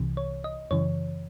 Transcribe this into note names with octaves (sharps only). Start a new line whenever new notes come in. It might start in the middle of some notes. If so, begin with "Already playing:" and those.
Already playing: C2 C3 E3
C#5
D#5
F#2 C#3 E3 C#5